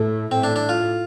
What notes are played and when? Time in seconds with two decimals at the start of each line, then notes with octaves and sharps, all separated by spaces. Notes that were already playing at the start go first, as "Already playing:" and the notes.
Already playing: A2 A3
0.31 A2 C4
0.44 D4
0.56 D4
0.69 F4